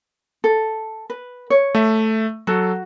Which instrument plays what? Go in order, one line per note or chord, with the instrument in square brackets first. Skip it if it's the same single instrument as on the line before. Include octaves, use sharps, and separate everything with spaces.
[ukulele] A4
B4
C#5
[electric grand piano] A3 E5
[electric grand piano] F#3 A4 [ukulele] F#4